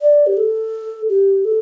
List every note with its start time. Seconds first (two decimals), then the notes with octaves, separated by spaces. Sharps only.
0.01 D5
0.27 G4
0.37 A4
1.09 G4
1.45 A4